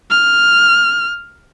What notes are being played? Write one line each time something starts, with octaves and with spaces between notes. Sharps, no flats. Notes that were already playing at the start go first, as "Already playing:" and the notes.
F6